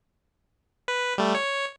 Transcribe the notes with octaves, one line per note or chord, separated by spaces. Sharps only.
B4
G3 A3
C#5